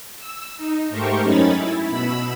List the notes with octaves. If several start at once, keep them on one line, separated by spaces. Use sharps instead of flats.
E6
D#4
G#2 A3 G4 A#4 C5 C#6
F#2 C#4 D#4 C#5 B5 A6
E4
B2 B5 E6